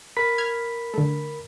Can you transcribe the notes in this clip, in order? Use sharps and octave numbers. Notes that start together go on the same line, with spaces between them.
A#4 B5 B6
F6 G#6
D3 A3